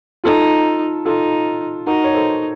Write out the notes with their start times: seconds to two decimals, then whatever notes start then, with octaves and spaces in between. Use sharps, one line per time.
0.24 D#4 F4 A4
1.05 D#4 F4 A4
1.87 D#4 F#4 A#4
2.04 C#5
2.14 A4 C5